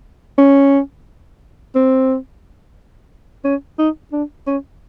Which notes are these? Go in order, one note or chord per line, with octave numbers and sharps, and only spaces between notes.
C#4
C4
C#4
D#4
D4
C#4